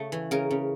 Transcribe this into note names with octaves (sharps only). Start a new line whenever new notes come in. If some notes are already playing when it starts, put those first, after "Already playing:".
Already playing: C#3 A3
E3
C#3 A#4
C#3